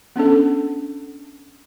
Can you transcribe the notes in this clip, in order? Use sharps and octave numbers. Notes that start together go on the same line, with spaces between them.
B3 C#4 D4 A4